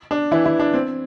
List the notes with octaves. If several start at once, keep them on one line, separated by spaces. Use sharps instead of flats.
D4
E3 E4
E3 E4
D4
C4